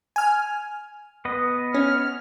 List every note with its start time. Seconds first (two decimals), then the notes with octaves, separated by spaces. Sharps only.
0.16 G#5 F6
1.25 B3 B4 D#5
1.74 C#4 F6